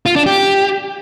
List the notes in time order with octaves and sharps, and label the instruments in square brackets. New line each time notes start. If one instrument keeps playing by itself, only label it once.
[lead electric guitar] F4
D4
G4